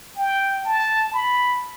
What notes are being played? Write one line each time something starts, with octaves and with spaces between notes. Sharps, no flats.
G5
A5
B5